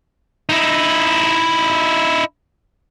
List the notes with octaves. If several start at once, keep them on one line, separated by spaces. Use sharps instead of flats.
D#4 E4